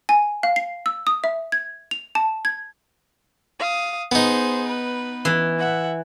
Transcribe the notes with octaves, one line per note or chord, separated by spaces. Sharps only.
G#5
F5
C7
E6
D#6
E5
G#6
F7
A5
G#6
F5 D#6
B3 D#4 G#4 C5
B4
E3
E5 F#5